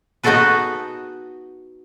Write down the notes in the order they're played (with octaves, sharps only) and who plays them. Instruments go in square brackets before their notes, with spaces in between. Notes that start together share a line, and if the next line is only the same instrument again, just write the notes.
[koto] B3 D#4 F#4 G#4 A4 B4